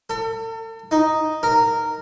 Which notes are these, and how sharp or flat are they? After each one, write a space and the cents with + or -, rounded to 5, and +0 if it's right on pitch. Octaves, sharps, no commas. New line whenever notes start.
A4 +40
D#4 +0
A#4 -15